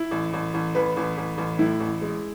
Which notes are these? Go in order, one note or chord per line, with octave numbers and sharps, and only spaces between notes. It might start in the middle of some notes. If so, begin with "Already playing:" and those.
Already playing: E4
A1
A1
A1
A1 B4
A1
A1
A1
A2 E4
A1
G#3